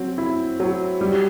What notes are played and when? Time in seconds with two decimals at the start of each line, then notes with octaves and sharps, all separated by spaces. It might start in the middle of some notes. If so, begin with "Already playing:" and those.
Already playing: F#3 C4
0.18 E4
0.60 F#3
1.01 G3